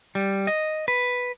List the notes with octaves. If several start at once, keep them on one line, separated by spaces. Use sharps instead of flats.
G3
D#5
B4